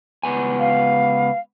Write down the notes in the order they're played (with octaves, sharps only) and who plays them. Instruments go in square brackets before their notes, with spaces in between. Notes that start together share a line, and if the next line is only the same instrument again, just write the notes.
[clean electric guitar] C#2 B3 G#5
[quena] F5